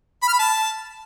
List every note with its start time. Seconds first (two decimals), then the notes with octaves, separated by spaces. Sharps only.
0.22 B5
0.28 F6
0.33 B5
0.39 A5